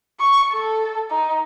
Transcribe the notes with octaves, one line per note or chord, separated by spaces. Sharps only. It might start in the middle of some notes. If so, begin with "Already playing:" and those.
C#6
A4
D#4